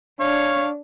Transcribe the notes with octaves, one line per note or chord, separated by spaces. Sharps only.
D4 C#5 F5